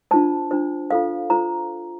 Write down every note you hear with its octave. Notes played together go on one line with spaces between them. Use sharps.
D4 F4 C5 A5
D4 F4 C5
F4 A4 C5 F5
F4 A4 C5 A#5